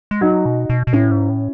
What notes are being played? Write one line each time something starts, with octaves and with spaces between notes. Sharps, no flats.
G#3
F#3 D#4 F#4
B2
B2
B2
A2 C#4 E4
G#2
A2